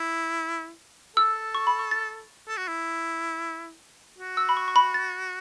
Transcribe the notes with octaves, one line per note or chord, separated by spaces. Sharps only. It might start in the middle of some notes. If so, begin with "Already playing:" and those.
Already playing: E4
A4 E6
C#6
B5
C#6
A6
A4
F#4
E4
F#4
E6
B5
C#6
C#6
B5
A6